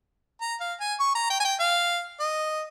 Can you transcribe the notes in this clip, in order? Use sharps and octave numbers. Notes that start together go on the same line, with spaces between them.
A#5
F5
G#5
C#6
A#5
G5
G#5
G5
F5
D#5